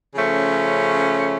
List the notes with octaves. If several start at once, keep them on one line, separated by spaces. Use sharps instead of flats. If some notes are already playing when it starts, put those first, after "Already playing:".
C#3 F3 A3 C#4